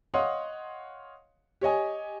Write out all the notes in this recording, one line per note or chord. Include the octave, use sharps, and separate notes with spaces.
C#5 D#5 F5 F#5 C6 D#6
G4 C#5 D#5 G#5